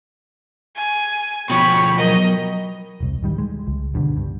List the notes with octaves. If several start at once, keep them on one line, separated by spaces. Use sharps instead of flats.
G#5
B2 F3 C#5 G5 B5
F#3 A#4 D#5
E1 C2
D1 D#3 G3
G#3
C#2
C#2 G2 B2 D3
G2